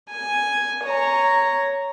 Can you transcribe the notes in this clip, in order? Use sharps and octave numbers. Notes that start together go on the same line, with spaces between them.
G#5
C#5 A#5